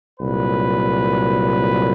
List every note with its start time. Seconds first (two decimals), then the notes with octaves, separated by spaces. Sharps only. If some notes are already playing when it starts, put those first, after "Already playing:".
0.19 C2 A#2 F#3 B4